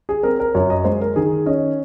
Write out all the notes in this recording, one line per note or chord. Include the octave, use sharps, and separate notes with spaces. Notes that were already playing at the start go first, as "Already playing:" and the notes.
G#4
C4 A#4
A#4
F#2 C#5
D#5
G#3 C5
A#4
D#3 G#4
C#4 D#5